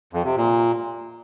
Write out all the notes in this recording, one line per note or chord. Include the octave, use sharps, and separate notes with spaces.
F2
C3
A#2